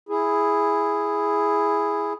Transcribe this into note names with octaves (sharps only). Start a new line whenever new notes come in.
E4 G#4